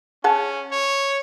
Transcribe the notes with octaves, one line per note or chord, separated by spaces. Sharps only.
C#4 G#4 F#5 A5
C#5